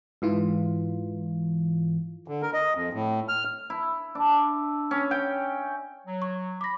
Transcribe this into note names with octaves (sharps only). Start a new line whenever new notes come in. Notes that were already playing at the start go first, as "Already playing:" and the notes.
G#2 E3 F4
D3
A#4
D#5
F2
A2
F6
E4
D4
C#4
G5
F#3
C#6
B5 D6 A#6